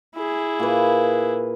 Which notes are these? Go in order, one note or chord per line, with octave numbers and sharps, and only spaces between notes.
E4 G#4
A#2 B4